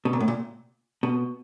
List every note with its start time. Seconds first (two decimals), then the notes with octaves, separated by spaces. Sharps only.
0.05 B2
0.13 A#2
0.20 A2
0.28 A#2
1.03 B2